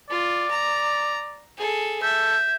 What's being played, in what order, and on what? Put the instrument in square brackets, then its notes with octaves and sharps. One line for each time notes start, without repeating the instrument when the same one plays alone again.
[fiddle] F4 [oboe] D5
[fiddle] A#5
G#4 A4
[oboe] A4 [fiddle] E5 [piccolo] G6